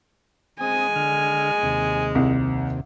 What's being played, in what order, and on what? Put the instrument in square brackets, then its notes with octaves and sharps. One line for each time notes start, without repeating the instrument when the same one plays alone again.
[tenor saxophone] G#3 [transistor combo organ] C4 D#6 [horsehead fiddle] G#5
[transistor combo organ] D3 F6
D#2 C3
[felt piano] C2